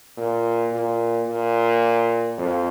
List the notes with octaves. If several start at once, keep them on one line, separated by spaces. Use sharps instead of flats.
A#2
A#2
A#2
F2